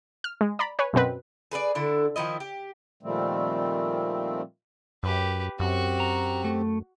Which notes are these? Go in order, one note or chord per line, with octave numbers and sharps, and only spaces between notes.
F6
G#3
D5 A#5 B5
B4 C#5 G#5
F#2 B2 C4 B4
G#4 B4 C#5 D5
D3 D4 E4 A4
D#3 F3 E4 D#5
G4
A#2 D#3 F3 G3 A3 C4
F#2 G4 B4
F#2 C4 F#4 G4 C#6
A#5
A3